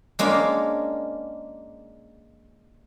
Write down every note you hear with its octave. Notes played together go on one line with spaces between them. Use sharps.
G#3 A#3 C#4 D4 F4